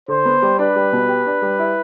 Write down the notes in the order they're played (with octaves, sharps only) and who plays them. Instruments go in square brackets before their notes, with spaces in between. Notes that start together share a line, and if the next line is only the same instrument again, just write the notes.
[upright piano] D3 [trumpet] C5
[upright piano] B3
G3
[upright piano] D4 [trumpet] B4
[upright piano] G3
B2
G4
D4
G3
E4